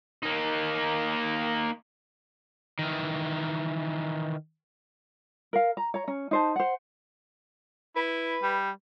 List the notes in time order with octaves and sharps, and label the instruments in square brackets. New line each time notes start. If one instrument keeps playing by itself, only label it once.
[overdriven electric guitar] A#3 D#4
D#3 E3
[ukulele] A#4 F5
A#5
C#5 A#5
C#4
D#4 C5 A5
C5 F#5
[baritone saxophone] E4 [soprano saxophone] B4
[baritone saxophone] G3